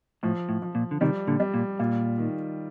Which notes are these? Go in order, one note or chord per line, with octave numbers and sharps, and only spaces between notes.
A2 F3
A2
F3
A#2
D3
C3 D#3 G3
A#2 D3
G3
A#2
A#2 F4
D#3